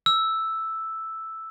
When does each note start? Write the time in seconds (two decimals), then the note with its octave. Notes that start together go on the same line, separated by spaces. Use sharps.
0.06 E6